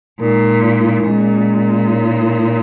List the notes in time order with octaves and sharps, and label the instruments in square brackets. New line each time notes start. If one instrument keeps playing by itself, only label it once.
[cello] A#2 [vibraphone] G#3 D#4 A#4
[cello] A#2 [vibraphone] G#3 C#4 G#4 D#5
[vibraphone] D#4 A#4 C#5